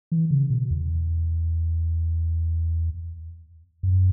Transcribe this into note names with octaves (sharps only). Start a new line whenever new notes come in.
E3
C#3
B2
E2
F#2